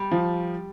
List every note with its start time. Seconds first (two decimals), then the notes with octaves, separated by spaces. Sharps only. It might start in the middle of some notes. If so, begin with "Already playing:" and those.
Already playing: G3
0.11 F3